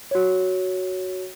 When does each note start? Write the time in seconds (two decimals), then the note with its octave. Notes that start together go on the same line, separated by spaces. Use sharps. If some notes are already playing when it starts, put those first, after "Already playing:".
0.11 F#4 C#5